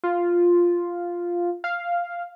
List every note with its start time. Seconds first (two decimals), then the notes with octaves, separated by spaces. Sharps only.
0.04 F4
1.64 F5